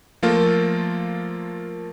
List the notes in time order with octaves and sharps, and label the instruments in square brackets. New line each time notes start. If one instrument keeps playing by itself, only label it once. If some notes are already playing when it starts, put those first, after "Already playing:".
[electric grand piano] F3 A3 A#3 F4 A4 A#4